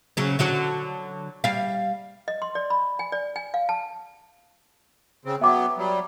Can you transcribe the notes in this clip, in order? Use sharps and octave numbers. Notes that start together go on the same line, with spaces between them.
C#3 F#3 C#4
D3 F#3 F#4
G3 F5
D#5
C6
D5
B5
G#5
D5
G#5
F5
A5
C#3 C4
F#3 B3 E5 G5 D6
F#3 G3